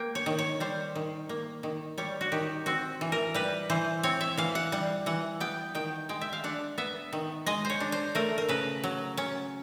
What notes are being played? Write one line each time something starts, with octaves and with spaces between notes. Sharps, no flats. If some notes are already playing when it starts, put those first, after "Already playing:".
Already playing: A#3 G5
C#5
D#3
C#5
G3 C5
D#3
A#3
D#3
G3 C#5
F#4
D#3 G4
C4 F#4
E3
A#4
G3 B4
E3 C5
C4 C#5
E5
E3 F5
F#5
G3 F#5
E3 F#5
B3 G5
D#3 G5
G#3 G5
E5
F5
D4 F#5
B3 E5
D#3
G#3 D#5
C5 C#5
D4
C5
A3 A#4
A#4
C#3 B4
F#3
C#4